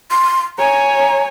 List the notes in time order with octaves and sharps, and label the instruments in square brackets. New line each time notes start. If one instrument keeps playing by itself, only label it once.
[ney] C6
[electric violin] C#5 G#5 [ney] A#5